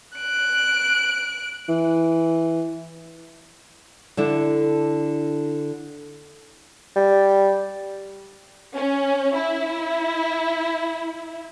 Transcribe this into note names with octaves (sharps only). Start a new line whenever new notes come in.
F#6 D7
E3
D3 D4 E4 A4
G3
C#4
E4